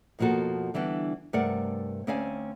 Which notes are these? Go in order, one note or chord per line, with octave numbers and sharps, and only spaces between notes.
F2 B2 F3 A#3 F#4 A4
D3 E3 G3 B3 D4
G2 C3 A3 A#4 D5 F#5
D2 C4 C#4 D5 F5 G#5